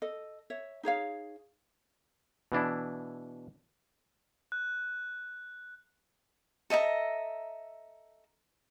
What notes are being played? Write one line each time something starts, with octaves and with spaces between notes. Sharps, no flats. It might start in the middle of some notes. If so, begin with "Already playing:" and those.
A4 D#5
C#5 E5
D#4 G#4 C#5 F5
B2 E3 D4 E4
F#6
A4 D#5 E5 A#5